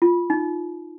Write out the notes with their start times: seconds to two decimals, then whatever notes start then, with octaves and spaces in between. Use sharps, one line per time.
0.02 F4
0.30 D#4